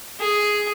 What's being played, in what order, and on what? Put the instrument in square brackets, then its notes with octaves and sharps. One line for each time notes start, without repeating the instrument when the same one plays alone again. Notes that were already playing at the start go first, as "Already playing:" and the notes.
[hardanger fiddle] G#4